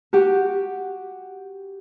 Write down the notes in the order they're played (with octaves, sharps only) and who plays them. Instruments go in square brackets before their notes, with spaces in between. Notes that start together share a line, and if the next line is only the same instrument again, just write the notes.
[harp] F#4 G4